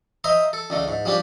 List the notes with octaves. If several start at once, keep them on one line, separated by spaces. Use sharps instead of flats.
C5 D#5 E5 A#5 C6
A4
C#2 D3 A3
G#2
F3 G3 C#4 D4 G4